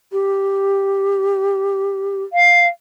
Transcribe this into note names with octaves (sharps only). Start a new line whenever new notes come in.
G4
F5